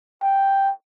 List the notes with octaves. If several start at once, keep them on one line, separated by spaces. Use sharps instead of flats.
G5